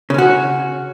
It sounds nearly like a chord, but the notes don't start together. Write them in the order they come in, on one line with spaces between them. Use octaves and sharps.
C#3 C#4 F#4